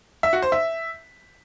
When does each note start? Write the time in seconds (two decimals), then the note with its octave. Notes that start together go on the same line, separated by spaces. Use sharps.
0.23 E5
0.33 F#4
0.42 C5
0.52 E5